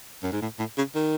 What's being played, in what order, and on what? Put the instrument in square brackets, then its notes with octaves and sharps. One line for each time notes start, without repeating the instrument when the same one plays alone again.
[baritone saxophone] F#2
G#2
A2
A2
C#3
D#3